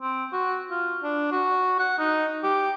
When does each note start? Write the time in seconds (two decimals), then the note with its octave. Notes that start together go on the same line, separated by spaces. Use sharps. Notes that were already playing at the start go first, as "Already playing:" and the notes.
0.01 C4
0.33 F#4
0.71 F4
1.03 D4
1.32 F#4
1.79 F#5
1.99 D#4
2.43 G4